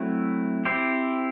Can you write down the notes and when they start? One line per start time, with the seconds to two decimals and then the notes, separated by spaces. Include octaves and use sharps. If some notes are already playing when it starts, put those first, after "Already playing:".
Already playing: F#3 A3 C4 E4
0.65 C4 E4 G4 C5